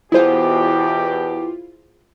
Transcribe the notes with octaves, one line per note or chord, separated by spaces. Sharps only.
E2 B2 E4 F4 G4 G#4 C5 F#5